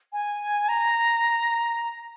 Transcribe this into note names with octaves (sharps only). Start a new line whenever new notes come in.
G#5
A#5